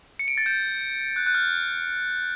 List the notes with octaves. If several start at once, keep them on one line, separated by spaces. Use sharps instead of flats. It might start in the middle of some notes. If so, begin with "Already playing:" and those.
C#7
D7
A6
G6
F#6
F#6
F6